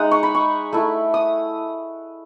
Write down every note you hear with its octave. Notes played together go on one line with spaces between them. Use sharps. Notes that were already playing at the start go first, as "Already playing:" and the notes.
Already playing: G#3 D#4 F#5 D#6
C#6
B5
C#6
A3 E4
D#6